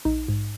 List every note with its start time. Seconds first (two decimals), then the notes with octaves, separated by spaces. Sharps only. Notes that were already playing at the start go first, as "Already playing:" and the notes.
0.05 A#1 D#4
0.28 G#2